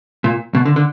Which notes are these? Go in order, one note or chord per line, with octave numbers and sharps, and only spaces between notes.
A#2
B2
D3
D3